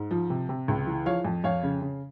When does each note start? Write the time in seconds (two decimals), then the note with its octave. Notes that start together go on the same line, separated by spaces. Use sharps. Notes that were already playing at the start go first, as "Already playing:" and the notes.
Already playing: G#2
0.11 F3
0.30 C3
0.49 C3
0.68 C#2
0.87 E3
1.06 F3 C#5 F5
1.25 F2
1.44 F2 C#5 F5
1.63 C#3
1.82 C#3